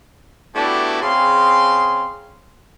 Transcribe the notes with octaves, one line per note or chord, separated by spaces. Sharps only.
A3 B3 D4 E4 F#4 G4
C#3 C4 G#4 F5 C6